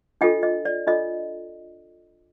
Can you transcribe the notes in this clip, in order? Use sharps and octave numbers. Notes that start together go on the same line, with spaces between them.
D4 F4 A4 D#5 G5
D#5
D5
D4 F4 A4 D#5